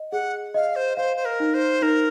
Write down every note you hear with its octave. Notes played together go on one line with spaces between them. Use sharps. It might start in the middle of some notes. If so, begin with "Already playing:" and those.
Already playing: D#5
G#4 F#5
D#5 F5
C5
C5 F5
C5
A#4
D#4
C5
D#4 A#4